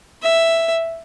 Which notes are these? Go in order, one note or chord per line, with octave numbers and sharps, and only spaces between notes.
E5